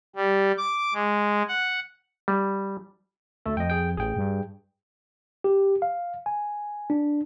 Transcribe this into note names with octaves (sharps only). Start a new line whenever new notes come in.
G3
D6
G#3
F#5
G3
D2 A3 A4
F2 D#5 G5
G#4 G5
A1 G#4 G5
G2
G4
F5
G#5
D4